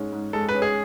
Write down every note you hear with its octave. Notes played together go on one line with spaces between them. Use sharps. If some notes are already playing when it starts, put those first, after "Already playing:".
Already playing: G#2 G#3 C#4
G#2
G#3 A4
B4
C#4
G#4